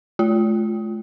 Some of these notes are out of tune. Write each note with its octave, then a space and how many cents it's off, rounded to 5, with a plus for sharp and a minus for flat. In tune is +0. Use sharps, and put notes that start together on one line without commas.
A3 -40 F4 -10